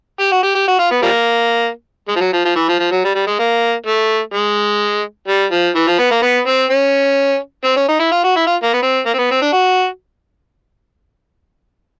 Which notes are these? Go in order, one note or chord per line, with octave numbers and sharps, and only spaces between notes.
G4
F#4
G4
G4
F#4
F4
B3
F3 G3 A#3
G#3
F3
F#3
F3
F3
E3
F3
F3
F#3
G3
G3
G#3
A#3
A3
G#3
G3
F3
E3
F3
B3
A#3
B3
C4
C#4
C4
C#4
D#4
E4
F4
F#4
E4
F4
A#3
B3
C4
A#3
C4
B3
C4
D4
F#4